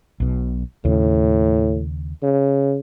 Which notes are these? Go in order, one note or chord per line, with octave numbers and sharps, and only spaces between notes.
B1 B2
D#2 A2 C#3
C#3